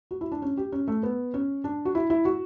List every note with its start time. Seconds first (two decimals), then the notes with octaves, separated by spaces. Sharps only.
0.11 F#4
0.21 E4
0.32 D4
0.42 C#4
0.57 G4
0.72 C#4
0.88 A3
1.03 B3
1.34 C#4
1.64 D4
1.85 F#4
1.95 E4
2.10 E4
2.25 F#4